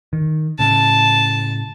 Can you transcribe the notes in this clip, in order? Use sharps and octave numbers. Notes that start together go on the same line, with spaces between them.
D#3
A2 C#3 A5